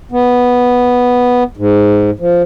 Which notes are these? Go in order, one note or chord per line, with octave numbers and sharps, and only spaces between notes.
B3
G#2
F3